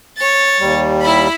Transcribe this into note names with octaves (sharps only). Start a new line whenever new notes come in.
C#5 A6
D#2 G3
E4 B5